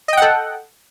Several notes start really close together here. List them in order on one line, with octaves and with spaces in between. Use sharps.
D#5 G5 F#5 A4